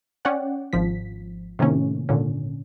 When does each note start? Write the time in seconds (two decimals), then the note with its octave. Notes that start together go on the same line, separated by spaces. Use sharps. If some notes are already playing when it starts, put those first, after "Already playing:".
0.25 C#4 C#5 D5 F#5 G5
0.73 G#1 F3 B6
1.59 A2 C3 D#3 A#3 C#4
2.09 G#1 A#2 D3 C#4